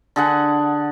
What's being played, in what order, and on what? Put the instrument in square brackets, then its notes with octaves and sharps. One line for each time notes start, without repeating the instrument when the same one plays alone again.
[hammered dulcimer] D3 G#4 F#5